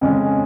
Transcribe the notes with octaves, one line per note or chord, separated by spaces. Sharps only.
F2 C#3 G#3 C#4